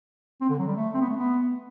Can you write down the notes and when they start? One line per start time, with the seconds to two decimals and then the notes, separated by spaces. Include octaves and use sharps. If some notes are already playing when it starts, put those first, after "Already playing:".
0.41 C4
0.50 D3
0.59 F#3
0.67 G3
0.76 A3
0.94 C4
1.01 B3
1.10 A3
1.17 B3